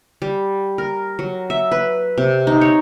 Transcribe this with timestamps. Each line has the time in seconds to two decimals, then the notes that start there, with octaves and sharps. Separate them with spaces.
0.22 G3
0.78 A#4
1.19 F#3
1.50 E5
1.72 B4
2.18 C3
2.47 D#4
2.61 C#5